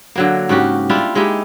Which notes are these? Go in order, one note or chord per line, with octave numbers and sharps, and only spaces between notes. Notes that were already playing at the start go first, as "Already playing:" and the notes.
D3 F#3 A#3
G#2 C#3 F#4 G4
G3 D4 E4 F4
G#3 D#4 E4 G4